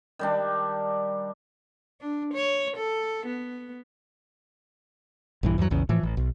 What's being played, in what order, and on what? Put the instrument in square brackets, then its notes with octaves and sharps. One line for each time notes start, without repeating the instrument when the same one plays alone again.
[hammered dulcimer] D#3 G3 D4
[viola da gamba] D4
C#5
A4
B3
[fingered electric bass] A#1 G2 E3
E2 G2 D#3 F#3
A#1 E2 C#3
A2 E3 F3
A1
B1